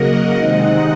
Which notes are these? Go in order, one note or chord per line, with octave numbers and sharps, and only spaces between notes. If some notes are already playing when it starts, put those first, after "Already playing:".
Already playing: C#3 F#3 A#3 A#4 D#5 F#5
C3 D#3 G#3 C4 D#4 D#5 F#5